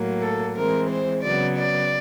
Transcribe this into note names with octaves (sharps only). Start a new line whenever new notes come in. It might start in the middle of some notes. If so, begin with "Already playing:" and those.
Already playing: A2 F#3 A#3
A4
E3 G#3 C4 A#4
C5
C#3 F#3 B3 D5
D5